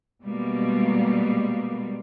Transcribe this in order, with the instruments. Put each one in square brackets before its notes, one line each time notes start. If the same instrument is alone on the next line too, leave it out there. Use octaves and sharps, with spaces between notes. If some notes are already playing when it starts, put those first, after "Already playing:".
[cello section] B2 G3 G#3 A#3